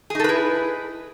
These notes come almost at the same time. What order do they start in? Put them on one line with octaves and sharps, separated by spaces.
G#4 D#4 A4 B4 E4